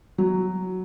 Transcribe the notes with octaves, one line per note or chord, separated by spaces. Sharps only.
F#3